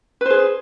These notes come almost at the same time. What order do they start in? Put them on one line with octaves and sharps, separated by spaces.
B4 C5 G#4